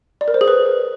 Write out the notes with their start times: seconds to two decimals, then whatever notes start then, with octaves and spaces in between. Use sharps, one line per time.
0.21 D5
0.28 A#4
0.34 C5
0.41 G#4
0.48 B4